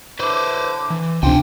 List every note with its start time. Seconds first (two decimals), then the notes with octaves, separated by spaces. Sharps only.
0.19 D3 E4 B4 C5 D6
0.90 E3
1.23 C#2 C3 D4 C5 F5 G5 G#5